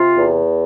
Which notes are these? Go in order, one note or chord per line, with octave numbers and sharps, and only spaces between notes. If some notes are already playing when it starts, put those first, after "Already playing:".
Already playing: C3 F4
E2